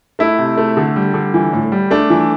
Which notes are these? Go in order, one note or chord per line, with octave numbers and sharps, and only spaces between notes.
A3 E4
C3
A3
D3
G3
D3
E3
A2
G3
A3 D4
E3